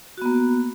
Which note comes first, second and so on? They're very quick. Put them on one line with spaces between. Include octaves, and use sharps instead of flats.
F#4 B3 A#3